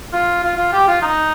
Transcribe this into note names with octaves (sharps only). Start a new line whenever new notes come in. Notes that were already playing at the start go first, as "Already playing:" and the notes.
F4
F4
F4
G4
F4
D#4